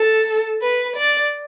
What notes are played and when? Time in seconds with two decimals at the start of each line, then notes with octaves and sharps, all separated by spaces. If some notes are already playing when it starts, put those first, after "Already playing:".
Already playing: A4
0.62 B4
0.96 D5